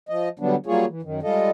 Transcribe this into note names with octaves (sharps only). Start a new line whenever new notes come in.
F3 D#5
D3 F#3 G3 B3 D4
F#3 G3 A#3 F4 G#4 C#5
E3
F#2 D#3
G3 G#3 F4 A4 D#5